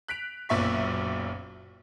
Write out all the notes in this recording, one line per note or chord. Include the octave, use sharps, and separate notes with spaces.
F#6 B6 D7 F7
F#1 B1 A#2 E5 C#6 B6